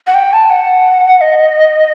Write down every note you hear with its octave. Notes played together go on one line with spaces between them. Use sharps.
F#5
G5
A5
F#5
D#5